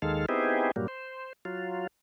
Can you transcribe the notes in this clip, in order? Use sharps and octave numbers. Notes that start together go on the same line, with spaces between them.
D#2 D#3 G#3 A4 F5
B3 C4 D#4 E4 G4 G#4
G2 A#2 F#3 G3 A#3
C5
F#3 F4